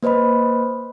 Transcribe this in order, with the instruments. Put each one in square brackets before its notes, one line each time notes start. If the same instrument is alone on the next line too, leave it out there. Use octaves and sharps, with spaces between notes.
[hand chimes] A#3 B4 C5 D#5 B5